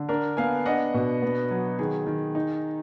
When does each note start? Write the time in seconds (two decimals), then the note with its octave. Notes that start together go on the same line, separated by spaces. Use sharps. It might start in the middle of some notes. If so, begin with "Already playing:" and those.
Already playing: D3
0.09 D4 A#4
0.37 B3 F5 G#5
0.66 D4 D#5 F#5
0.94 B2
1.22 B3
1.51 F#3
1.79 D#3 G#4
2.07 D#3
2.35 D#4